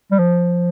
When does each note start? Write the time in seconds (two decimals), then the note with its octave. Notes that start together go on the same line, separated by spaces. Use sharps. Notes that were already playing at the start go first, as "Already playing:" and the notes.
0.12 G3
0.19 F3